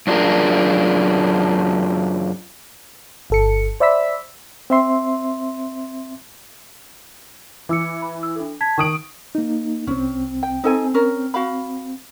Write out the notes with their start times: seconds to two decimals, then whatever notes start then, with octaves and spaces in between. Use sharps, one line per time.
0.07 F#2 D4 F4 G#4 A#4
3.30 G1 A4 C#7
3.80 C5 D5 E5 B5 E6 B6
4.70 C4 E5 C6
7.69 E3 D6 E6 C#7
8.02 B5
8.23 E6
8.36 D4 A4
8.61 A5 G#6 B6
8.78 D#3 C#6 D#6 D7 F#7
9.35 A#3 D#4
9.87 C2 C4 C#4
10.43 G5
10.64 C4 D#4 A4 G#5
10.94 C#4 A#4
11.34 F#4 F5 B5